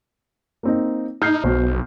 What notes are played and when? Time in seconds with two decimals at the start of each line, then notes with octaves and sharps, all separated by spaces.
0.63 A#3 C4 D#4
1.22 D#4 F6 G6 C7
1.44 B1 B2 C5